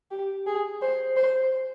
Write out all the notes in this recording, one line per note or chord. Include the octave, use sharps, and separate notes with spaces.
G4
G#4
C5
C5